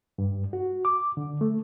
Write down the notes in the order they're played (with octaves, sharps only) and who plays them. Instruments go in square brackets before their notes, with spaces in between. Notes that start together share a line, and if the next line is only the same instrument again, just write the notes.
[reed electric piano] G2
F#4
D6
D3
A3